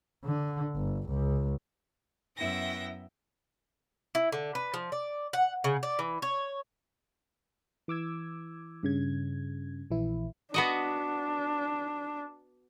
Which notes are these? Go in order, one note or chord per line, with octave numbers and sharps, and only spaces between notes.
D3
G1
C#2
F#2 B3 E4 E5 G5 A#6
E4
D3
B4
F3
D5
F#5
C#3
D5
E3
C#5
E3 D6 E6 G#6
G2 C#3 G#6
A#1 E3 E4
B3 D4 F#4 D#5